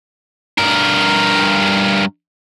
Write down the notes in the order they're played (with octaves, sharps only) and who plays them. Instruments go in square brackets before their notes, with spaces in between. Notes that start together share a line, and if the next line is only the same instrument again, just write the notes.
[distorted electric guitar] G2 A#4